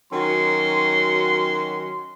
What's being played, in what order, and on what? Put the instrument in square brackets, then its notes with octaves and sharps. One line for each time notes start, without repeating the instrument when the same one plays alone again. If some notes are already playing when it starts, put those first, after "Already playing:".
[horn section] D#3 F#3 C#4 F#4 C6